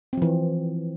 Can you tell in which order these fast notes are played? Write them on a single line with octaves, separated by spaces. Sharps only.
C4 F3 E3